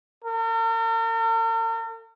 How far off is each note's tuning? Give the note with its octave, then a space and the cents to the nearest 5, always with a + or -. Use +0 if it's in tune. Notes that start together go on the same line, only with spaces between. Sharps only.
A#4 -45